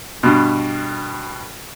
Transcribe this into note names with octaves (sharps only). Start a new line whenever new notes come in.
G2 B2